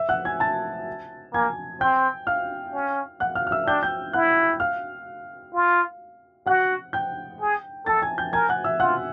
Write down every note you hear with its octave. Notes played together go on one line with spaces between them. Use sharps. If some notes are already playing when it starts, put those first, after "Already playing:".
Already playing: E5 E6
F#5 F#6
G#5 G#6
A5 A6
A#3 G#5 G#6
C4 G5 G6
F5 F6
C#4
F#5 F#6
F5 F6
F6
E5 E6
D4 G5 G6
G5 G6
E4 F#5 F#6
F5 F6
F4
F#4 F#5 F#6
G5 G6
G#4
A4 A5 A6
G#5 G#6
G5 G6
A#4 G#5 G#6
F#5 F#6
E5 E6
F4 F#5 F#6